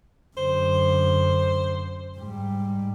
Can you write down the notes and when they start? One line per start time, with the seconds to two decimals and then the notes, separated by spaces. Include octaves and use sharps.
0.37 F#2 D3 C5
2.17 G#2 G3